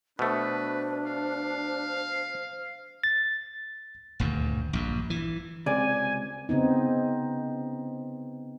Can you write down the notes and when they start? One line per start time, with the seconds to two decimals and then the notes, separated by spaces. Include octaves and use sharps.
0.19 B2 A3 D4 B4 C5
1.06 F5
3.04 A6
4.20 D#1 D2 G2
4.73 A#1 G2
5.10 E3
5.66 C#2 C3 D5 G#5
6.49 C#3 B3 C4 D#4